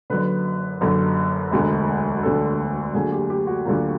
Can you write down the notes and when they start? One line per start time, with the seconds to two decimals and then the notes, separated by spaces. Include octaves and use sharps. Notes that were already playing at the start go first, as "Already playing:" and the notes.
0.10 F#1 F#2 D3 B4
0.81 F#1 F#2 D3
1.52 E1 D2 D3
2.23 E1 D2 D3 A4
2.95 D2 D3 F#3 A#3 G#4
3.12 G4
3.30 G4
3.47 F#4
3.65 D2 D3 F#3 A#3 F4